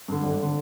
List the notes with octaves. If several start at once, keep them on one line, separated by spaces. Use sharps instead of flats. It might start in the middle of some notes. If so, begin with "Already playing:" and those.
G2 D3
G#1
D3